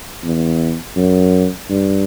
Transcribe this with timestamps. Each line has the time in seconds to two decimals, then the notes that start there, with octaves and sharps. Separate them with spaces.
0.23 E2
0.96 F#2
1.69 G2